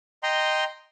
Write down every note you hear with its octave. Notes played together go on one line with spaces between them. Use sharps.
D#5 G5 A#5 C6